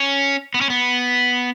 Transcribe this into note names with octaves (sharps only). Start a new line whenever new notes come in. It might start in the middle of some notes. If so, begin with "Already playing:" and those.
Already playing: C#4
B3
C#4
B3